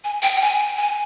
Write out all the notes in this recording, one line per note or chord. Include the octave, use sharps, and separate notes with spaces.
G#5
G5
G5
G#5
G#5